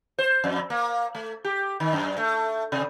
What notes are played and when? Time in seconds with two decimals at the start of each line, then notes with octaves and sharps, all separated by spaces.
0.18 C5
0.44 F2
0.70 A#3
1.15 A3
1.44 G4
1.80 D#3
1.93 F#2
2.18 A3
2.72 C3